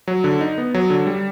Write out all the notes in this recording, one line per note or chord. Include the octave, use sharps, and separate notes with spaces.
F#3
D3
D#4
B3
F#3
D3
G3